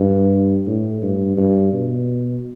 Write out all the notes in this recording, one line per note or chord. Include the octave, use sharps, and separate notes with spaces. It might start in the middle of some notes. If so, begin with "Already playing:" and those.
Already playing: G2
A2
G2
G2
B2